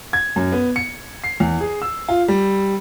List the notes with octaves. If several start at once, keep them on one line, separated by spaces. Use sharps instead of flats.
G#6
F#2
B3
C#7
C7
E2
G#4
E6
F4
G3